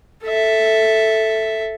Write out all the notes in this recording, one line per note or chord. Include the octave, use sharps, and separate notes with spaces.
A4 E5